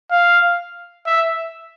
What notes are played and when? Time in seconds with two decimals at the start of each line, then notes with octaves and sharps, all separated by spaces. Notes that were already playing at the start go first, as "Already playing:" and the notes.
0.11 F5
1.06 E5